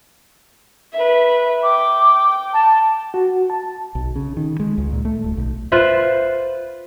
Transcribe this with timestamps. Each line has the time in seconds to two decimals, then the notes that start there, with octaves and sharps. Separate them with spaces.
0.93 B4 E5
1.63 G5 D6
2.54 A5
3.14 F#4
3.50 A5
3.95 B1
4.16 C#3
4.37 D#3
4.60 G#3
4.78 C#2
4.92 A#2
5.05 A3
5.24 D1
5.37 B1
5.72 F4 B4 C5 E5